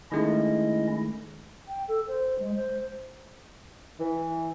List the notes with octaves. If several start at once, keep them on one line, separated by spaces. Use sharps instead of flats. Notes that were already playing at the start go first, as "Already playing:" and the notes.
D#3 G#3 A3 C#4 E4 D#5
G5
A4
C5
G#3
C5
E3